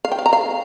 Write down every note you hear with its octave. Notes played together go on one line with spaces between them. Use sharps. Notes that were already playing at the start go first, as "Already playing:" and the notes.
F5
G5
F5
A#5
F5